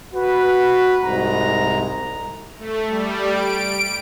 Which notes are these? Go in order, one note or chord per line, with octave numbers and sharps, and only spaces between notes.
F#4 B4
C2 G#2 A#5
A3
G3
D7